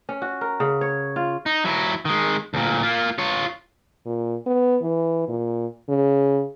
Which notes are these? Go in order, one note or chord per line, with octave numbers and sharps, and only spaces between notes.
C#4
F#4
A#4
C#3
C#5
F4
D#4
F#3 E4
D#3 G#3
D2 A#2
A#3 F4
F4 C#5
A#2
B3
E3
A#2
C#3